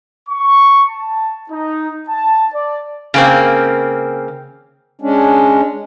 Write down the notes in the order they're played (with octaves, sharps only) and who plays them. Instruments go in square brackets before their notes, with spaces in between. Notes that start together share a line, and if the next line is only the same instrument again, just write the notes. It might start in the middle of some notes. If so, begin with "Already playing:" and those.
[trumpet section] C#6
A5
D#4
A5
D5
[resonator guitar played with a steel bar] C#3 A#3 C4
[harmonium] G#3 C#4 D4